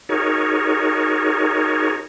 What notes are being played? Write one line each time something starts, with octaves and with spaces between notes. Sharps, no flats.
D#4 F#4 G#4 A#4 C#5